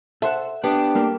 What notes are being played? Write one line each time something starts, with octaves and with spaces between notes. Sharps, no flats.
A4 C5 E5 F#5
B3 D4 G4
G3 A3 A#3